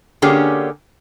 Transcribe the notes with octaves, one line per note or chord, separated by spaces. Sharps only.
D3 A#3 C#4 G4 G#4